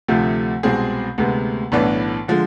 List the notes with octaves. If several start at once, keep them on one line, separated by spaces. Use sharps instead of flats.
D2 C3 F3 A3
C2 B2 G#3 C4 G#4
D2 C3 G#3 B3
B1 A2 E3 B3 D4
D3 F3 G#3